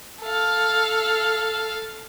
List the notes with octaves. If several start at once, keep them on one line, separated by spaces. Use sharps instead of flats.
A4 F5